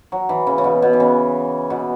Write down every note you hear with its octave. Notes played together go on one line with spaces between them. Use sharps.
F#3
E3
C#3
C#3
B2
B2
E3
C#3
B2